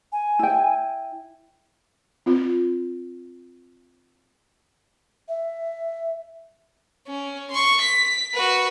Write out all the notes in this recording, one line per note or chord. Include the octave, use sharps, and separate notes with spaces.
G#5
E4 G5
C4 F4
E5
C#4
C6 C#6
B6
F#4 B4